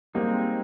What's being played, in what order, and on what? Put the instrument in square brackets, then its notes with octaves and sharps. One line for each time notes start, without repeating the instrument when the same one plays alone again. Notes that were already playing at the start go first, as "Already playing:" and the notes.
[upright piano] G3 A#3 [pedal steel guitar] G#3 C4 D#4